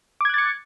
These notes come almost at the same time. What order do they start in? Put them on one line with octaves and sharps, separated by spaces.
D6 G#6 F#6 A6 C#7